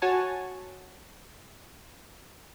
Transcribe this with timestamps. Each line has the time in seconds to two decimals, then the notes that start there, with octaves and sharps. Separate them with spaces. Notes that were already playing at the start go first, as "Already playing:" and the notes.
0.02 F#4 C#5 G#5 A5